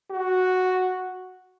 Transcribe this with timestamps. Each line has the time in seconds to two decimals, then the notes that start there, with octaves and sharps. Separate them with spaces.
0.10 F#4